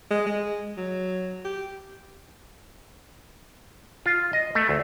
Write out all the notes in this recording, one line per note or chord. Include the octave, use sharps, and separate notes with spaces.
G#3
G#3
F#3
G4
F4
D#5
A3
D2